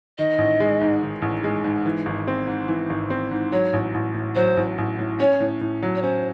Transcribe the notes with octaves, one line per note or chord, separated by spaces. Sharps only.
D#3 D#5
A1
G#3
G#2
D#3
A1
G#3
G#2
E3
G#1
C4
G#2
E3
G#1
C4
G#2
F#3 C#5
A1
A1
A2
F#3 C5
A1
A1
A2
C#4 C#5
A2
A2
F#3
C#5
C#4 C5